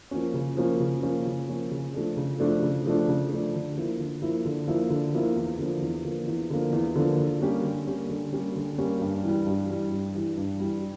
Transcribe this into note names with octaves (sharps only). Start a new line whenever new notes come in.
F3 A#3 C#4
C#3
F3 A#3 C#4
C#3
F3 A#3 C#4
C#3
F3 A#3 C#4
C#3
F3 A3 D4
C#3
F3 A3 D4
C#3
F3 A3 D4
C#3
F3 A3 D4
D3
F3 A#3 E4
D3
F3 A#3 E4
D3
F3 A#3 E4
D3
F3 A#3 E4
E2
D3 F3 A#3
E2
D3 F3 A#3
E2
D3 F3 A#3
E2
D3 F3 A#3
D3
G3 A#3 C#4 G4
D3
G3 A#3 C#4 G4
D3
G3 A#3 C#4 G4
D3
G3 A#3 C#4 G4
G2
E3 G3
G2
E3 G3
G2
E3 G3
G2
E3 G3